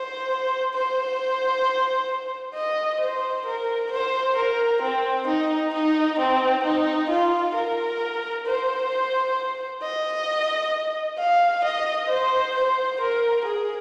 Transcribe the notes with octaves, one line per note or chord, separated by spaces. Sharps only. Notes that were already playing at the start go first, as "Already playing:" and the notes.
Already playing: C5
C5
D#5
C5
A#4
C5
A#4
C4
D#4
D#4
C4
D#4
F4
A#4
C5
D#5
F5
D#5
C5
C5
A#4
G#4